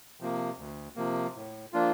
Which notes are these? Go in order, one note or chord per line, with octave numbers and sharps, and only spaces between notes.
C3 F3 A#3
D2
C3 F3 A#3
A2
F3 A#3 D4 F4